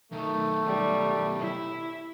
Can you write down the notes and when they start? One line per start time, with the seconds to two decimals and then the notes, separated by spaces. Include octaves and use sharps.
0.12 B1 D#3 A3
0.67 G3
1.39 E4